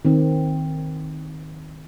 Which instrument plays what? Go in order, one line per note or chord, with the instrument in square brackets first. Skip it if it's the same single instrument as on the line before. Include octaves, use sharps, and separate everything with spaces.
[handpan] D#3 C4